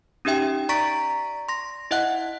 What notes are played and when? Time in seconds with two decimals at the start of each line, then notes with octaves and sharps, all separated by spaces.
0.25 C#4 D#4 G4 E5 G5
0.69 D5 A#5 C#6 A6 B6 D7
1.49 C6 A#6
1.91 E4 D#5 E5 F#5 F#6